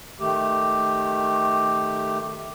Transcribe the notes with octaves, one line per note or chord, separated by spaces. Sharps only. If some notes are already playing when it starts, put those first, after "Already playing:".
D#3 A3 G4